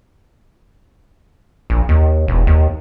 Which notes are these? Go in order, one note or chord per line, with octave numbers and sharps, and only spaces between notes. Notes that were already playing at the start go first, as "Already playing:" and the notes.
A#1
D#2
E1
D#2